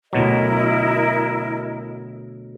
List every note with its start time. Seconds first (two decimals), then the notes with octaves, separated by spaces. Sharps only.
0.13 D2 B2 F#3 E4 A#4 D#5